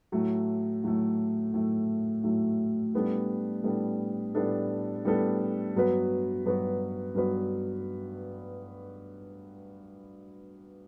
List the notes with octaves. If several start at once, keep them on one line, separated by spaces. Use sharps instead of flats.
A2 F#3 A3
A2 F#3 A3
A2 F#3 A3
A2 F#3 A3
A2 G3 B3 D4 A4
A2 G3 B3 D4 A4
A2 G3 B3 D4 A4
A2 G3 B3 D4 A4
G2 F#3 B3 F#4 B4
G2 F#3 B3 F#4 B4
G2 F#3 B3 F#4 B4